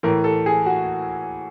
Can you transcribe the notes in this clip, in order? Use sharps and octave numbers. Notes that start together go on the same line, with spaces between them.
A2 E3 A#4
A4
G#4
F#4